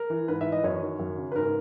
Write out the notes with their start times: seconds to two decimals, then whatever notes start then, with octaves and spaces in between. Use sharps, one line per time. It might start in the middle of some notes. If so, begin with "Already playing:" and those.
Already playing: A#4
0.10 E3
0.28 G#2 B4
0.41 E5
0.46 E3
0.52 D#5
0.64 F#2 C#5
0.81 D#3
0.99 F#2
1.18 C#3
1.32 B4
1.36 G#2 A#4